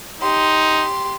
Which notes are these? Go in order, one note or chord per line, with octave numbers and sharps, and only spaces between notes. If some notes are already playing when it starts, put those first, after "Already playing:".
D#4 G4 C6